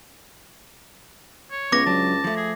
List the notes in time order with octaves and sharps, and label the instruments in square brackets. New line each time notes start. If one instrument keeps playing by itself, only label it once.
[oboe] C#5
[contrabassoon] C#2 [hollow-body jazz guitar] B3 [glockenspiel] D6 A#6
[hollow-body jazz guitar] F#3 D4 [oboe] A5
[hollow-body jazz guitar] F3 A3
[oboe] G#4